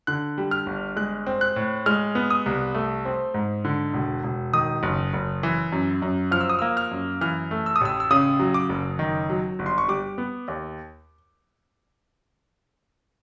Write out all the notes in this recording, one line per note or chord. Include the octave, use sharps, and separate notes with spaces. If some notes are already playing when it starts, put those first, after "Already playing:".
D3 F#6
G3
F6
G1
G#3 F#6
C4
F#6
A2
G#3 F6
B3
D#6
C2
A3
C4
G#2
D3
E1
E1
D#3 D#6
F#1
F#1
E3
F#2
F#2
F3 F6
E6
D#6
A#3 E6
F6
F#2
E3 F6
A3
E6
D#6
A1 E6
E6
C#3 D#6
F#3
D6
F#1
D#3
F#3
G1
C6
C#6
G3 D6
B3
D#2